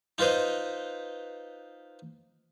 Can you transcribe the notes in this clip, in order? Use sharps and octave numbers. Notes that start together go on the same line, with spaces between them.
D#4 F4 B4 C5 D#5